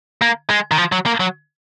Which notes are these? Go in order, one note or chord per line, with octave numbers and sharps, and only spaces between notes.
A#3
G#3
D#3
F3
F#3
A#3
F#3